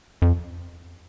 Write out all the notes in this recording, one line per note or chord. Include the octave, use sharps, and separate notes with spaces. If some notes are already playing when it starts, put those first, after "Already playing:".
F2